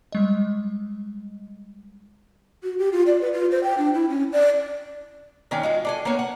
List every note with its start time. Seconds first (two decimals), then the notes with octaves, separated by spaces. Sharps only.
0.12 G3 G#3 D#5
2.63 F#4
2.78 G4
2.92 F4
3.07 D5
3.21 B4
3.33 F4
3.51 C5
3.63 G5
3.78 D4
3.94 E4
4.09 C#4
4.32 D5
5.51 D#3 C#4 D4 G5
5.63 G#3 F4 F#4
5.85 D4 A4 G#5
6.05 A#3 B3 D4 C#5
6.19 F#5